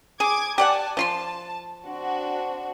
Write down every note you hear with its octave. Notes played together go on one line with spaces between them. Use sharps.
G#4 D6 G#6
G4 D5 F#5 G#5 A5
F3 F4 A5 C6
C4 D4 F#4